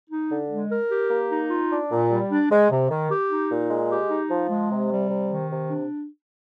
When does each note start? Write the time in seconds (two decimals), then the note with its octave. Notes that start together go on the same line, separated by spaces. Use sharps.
0.10 D#4
0.31 D3
0.50 G#3
0.70 A#4
0.91 G4
1.10 A#3
1.30 D#4
1.50 F4
1.70 D4
1.90 A#2
2.10 G3
2.30 D4
2.50 G#3
2.70 C3
2.90 D#3
3.10 G4
3.30 D#4
3.49 A#2
3.69 G#3
3.90 G4
4.10 D#4
4.29 F3
4.50 G#3
4.70 C3
4.90 G3
5.09 C3
5.29 D#3
5.50 C3
5.70 D4